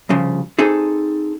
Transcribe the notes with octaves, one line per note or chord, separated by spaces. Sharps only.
C2 G2 C#3 F3
C4 D#4 G#4 A4